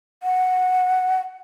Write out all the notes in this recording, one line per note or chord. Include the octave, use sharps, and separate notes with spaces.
F#5